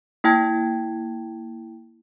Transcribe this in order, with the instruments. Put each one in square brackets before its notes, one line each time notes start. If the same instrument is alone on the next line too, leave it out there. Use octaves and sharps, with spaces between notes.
[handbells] A#3 E4 G5 A5 G#6